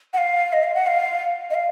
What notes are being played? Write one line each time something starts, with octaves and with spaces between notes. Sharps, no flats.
F#5
F5
D#5
F5
F#5
F5
D#5
F5